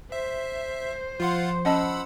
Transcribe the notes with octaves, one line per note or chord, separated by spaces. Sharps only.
C5 E5
F3 F4 F5 F#5 C6
C#4 D#5 F#5 A5 B5 E6